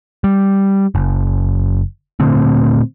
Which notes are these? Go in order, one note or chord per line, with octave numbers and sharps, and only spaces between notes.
G3
F#1
A#2 D3 A3 C4